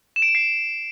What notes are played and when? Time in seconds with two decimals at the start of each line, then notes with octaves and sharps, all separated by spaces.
0.16 E7
0.22 D7
0.29 E7
0.35 C7